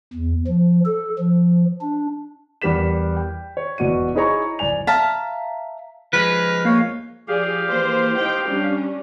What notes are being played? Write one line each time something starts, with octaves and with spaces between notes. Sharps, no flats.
E2
F3
A4
F3
D4
E2 G3 G4 A#4 B6 E7
G5
C#5
E1 B2 F#4 D5 D#7
D#4 E4 G#4 C#5 A#5 C#6
D1 D5 G#5 F7
E5 F5 A5 A#5
F3 G#3 B4 F6
A#3 C#5 F5
F3 G4 G#4 D5 F5
E3 A#3 C5
D#4 C5 G5
G3 C#4 D4